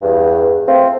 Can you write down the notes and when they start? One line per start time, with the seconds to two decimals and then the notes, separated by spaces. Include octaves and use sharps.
0.02 E2 G2
0.67 A3 C4 F4